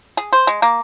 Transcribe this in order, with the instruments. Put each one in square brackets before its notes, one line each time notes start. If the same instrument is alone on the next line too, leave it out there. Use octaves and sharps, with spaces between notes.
[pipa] G#4
C5
G#3
A#3